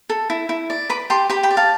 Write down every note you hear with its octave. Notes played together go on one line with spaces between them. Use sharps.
A4
E4
E4
D5
B4 B5 D6
G4 A5 C6
G4 G5 B5
G5 B5
D5
F5 A5